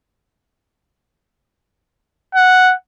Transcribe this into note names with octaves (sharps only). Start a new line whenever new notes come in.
F#5